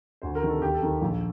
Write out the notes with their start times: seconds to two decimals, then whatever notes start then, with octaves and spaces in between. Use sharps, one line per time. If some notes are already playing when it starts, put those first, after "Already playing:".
0.22 D2 C5
0.35 A#4
0.42 C3 D#3
0.49 A4
0.62 D#2 G4
0.74 A4
0.83 D#3
1.01 A#1